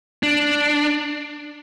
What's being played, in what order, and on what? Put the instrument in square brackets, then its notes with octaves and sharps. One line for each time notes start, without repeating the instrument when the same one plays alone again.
[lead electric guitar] D4